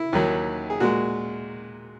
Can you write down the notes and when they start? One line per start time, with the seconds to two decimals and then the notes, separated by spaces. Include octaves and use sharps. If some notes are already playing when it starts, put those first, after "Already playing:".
Already playing: E4
0.13 D#2 D#3 F#3
0.70 G#4
0.80 A#2 G#3 F#4